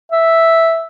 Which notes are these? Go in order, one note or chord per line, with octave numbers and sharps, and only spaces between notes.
E5